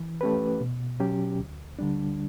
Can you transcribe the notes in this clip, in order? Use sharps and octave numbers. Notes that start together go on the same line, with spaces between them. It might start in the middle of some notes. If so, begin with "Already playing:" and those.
Already playing: E3
A3 C#4 G4 B4
B2
F#3 C#4 G4
D2
D3 G3 D4